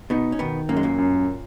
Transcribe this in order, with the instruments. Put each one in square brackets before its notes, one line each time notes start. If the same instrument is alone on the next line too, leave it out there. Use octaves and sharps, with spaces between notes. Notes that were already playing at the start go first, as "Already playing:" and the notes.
[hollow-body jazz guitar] B2 B3 [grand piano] D#4
[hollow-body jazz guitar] C#4
[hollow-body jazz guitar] B2 B3 [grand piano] D#3
[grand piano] F#2 [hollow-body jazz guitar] A#3
[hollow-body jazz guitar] G#3
A#2 A#3
[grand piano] F#2